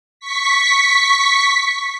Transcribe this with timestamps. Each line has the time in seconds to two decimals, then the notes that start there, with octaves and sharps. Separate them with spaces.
0.20 C#6 B6